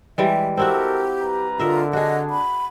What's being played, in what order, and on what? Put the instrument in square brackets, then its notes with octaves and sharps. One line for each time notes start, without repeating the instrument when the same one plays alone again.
[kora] E3 G3 G#3 [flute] E5
[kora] C4 E4 F#4 [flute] G4 [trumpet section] A4 A#4 F#5
[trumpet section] G3 B4 A#5
[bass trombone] D3 [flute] F4 [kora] A#4 D#5 E5
[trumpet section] D4 [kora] F#4 G#4 [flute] D#5
[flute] B5